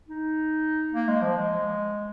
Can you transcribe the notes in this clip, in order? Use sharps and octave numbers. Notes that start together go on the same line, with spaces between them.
D#4
A#3
G#3
F3
G#3